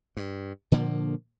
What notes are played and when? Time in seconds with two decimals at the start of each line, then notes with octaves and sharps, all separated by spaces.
0.17 G2
0.72 A#2 D3 F3 A#3